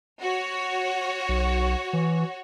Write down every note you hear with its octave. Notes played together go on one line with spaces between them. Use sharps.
F#4 C#5
B1
E3